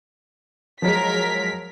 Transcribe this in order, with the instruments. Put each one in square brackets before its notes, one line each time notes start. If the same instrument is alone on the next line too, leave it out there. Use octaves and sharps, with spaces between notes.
[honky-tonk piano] F3 F#3 G#3 [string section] A#4 B6